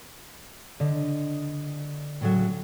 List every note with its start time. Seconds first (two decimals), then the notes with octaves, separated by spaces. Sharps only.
0.80 D3 D#5
2.21 A2 C#3 F#3